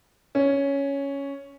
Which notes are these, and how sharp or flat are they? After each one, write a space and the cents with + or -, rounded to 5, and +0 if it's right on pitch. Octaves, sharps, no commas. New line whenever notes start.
C#4 +5